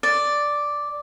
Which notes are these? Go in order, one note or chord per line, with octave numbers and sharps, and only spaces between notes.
D5